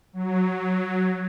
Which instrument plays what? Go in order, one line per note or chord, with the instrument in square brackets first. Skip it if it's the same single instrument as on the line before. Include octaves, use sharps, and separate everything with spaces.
[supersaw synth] F#3